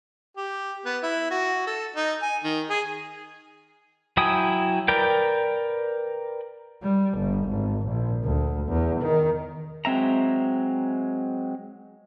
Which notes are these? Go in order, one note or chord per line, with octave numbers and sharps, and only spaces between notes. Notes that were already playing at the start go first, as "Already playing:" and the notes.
G4
B3
E4
F#4
A4
D#4
G#5
D#3
G#4
F#3 E4 G5 G#5 D#6
A#4 B4 D5 G5
G3
G1
G#1
A#1
D2
E2
D#3
F#3 G#3 C4 E5 A#5